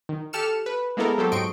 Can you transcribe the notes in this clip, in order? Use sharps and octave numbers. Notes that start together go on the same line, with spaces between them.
D#3
G4 A4 F6 C#7 E7
B4
G#3 A#3 B3 E4 A4 A#4
F#3 G4 A4 C5
G#2 D#5 G5 C6 C#6 D7